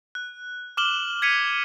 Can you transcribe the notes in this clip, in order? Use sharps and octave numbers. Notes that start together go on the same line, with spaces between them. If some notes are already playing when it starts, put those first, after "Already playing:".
F#6
D6 F6 E7 F#7 G7
G#6 B6 C#7 D#7 F7